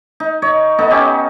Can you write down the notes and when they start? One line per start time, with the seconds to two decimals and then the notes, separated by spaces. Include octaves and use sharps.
0.20 D#4
0.42 C#5 D#5
0.78 B3 D#4 A4
0.91 C#4 D#4 G4